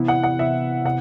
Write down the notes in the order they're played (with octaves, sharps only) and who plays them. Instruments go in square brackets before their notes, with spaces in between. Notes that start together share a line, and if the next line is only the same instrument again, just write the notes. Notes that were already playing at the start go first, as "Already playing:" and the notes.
Already playing: [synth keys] C3 E3 B3 E4
[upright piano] F#5
F#5
[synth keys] C3 E3 B3 E4 [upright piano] E5
[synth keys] C3 [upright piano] F#5